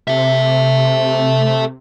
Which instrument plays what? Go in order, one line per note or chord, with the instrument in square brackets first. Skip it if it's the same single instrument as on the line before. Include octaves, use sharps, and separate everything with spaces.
[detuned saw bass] C3 [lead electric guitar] A4 E5